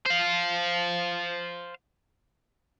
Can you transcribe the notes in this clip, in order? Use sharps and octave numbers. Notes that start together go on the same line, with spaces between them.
C5 F5